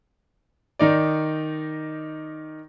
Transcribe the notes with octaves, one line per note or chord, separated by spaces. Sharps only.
D#3 D#4 D5